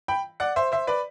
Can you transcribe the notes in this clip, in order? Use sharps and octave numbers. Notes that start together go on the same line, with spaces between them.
G5 B5
D5 F#5
C5 E5
C5 E5
B4 D5